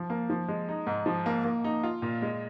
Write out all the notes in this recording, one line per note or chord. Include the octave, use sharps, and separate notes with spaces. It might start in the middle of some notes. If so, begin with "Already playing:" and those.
Already playing: F3
A#3
F3
G#3
D#4
G#2
F3
A#3
A#3
D#4
F4
A#2
G#3